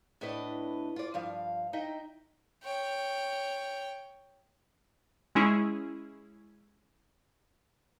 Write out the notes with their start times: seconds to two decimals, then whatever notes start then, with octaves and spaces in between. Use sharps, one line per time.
0.21 A2 D4 B4 D#5
0.96 F4 D5
1.14 G2 F3 F5
1.73 D#4 D#5 E5 G5
2.63 C#5 G5
5.35 G#3 C#4 E4 G#4